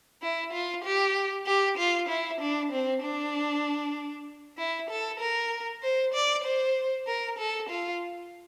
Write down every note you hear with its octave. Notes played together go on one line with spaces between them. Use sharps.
E4
F4
G4
G4
F4
E4
D4
C4
D4
E4
A4
A#4
C5
D5
C5
A#4
A4
F4